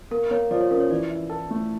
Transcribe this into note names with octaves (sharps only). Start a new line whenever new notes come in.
A#3 A#4
A#3 C#5
F3 D5
C#5
C#4 A#4
C#5
E3 D5
E4
A4
A3